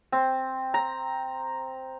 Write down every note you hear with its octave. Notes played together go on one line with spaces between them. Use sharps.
C4
A#5